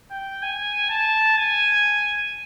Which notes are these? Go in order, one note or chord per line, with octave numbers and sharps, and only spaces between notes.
G5
G#5
A5
G#5